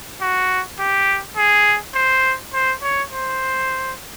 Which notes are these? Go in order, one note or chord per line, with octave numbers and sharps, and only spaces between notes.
F#4
G4
G#4
C5
C5
C#5
C5